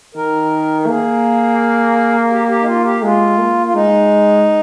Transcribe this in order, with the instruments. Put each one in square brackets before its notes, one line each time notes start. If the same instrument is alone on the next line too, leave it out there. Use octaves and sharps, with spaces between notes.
[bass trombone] D#3 [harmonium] A#4
[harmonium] A#4
[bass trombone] A#3 [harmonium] G#4
[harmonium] G4
G4
D#4
F4
G4
[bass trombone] G#3 [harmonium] F4
[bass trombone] A#3
[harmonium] F4
[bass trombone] G#3 [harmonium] D#4